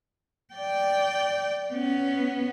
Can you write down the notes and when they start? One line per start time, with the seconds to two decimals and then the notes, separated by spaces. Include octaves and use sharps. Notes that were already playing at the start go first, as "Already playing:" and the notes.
0.54 D5 G5
1.73 B3 C#4